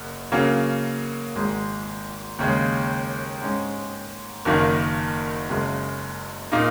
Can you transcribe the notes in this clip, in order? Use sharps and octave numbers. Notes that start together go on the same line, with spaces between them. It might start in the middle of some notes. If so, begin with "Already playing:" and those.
Already playing: F#1 F#2 C#3 A#3
C#3 F#3 A#3 C#4
G#1 G#2 G#3
D#2 C#3 G#3
G#2 G#3 C#4
F#1 F#2 D#3 A#3
F#1 F#2 C#3 G#3
A#2 A#3 D#4